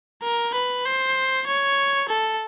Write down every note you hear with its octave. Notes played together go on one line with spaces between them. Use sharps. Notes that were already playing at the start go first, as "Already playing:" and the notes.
A#4
B4
C5
C#5
A4